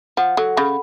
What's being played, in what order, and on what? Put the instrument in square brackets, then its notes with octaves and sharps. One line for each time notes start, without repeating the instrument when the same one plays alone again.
[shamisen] F3 [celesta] F#5
[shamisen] F#3 [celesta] A4
[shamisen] C#3 [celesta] B5